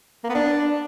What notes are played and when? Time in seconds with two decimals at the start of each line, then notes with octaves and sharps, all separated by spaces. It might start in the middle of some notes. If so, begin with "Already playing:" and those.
0.24 A#3
0.29 B3
0.34 D4